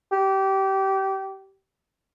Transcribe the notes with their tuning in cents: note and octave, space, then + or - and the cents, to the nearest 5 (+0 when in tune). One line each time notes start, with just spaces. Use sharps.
G4 -25